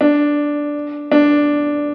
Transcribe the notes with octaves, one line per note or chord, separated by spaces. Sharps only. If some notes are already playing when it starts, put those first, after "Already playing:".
D4
D4